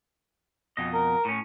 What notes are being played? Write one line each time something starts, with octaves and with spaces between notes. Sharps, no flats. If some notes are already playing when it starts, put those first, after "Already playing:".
F2 B2 D#5
A#4
A2 C#4